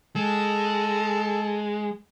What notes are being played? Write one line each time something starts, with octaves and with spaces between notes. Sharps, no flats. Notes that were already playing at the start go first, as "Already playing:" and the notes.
G#3 A4